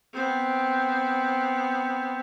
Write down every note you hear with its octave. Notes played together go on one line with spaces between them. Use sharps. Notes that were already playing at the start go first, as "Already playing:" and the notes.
B3 C4